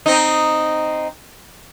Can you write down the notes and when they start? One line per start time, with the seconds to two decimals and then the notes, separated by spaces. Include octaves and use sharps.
0.06 C4 D#4